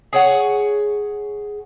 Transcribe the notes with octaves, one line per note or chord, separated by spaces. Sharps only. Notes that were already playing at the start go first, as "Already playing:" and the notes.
G#4 C#5 F#5